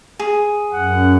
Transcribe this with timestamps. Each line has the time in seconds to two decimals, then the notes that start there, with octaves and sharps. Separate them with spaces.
0.19 G#4
0.73 F#2 F#5